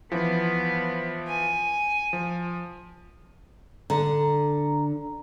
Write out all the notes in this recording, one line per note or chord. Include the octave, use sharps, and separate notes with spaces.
E3 F3 B3
G#5
F3
D3 A#5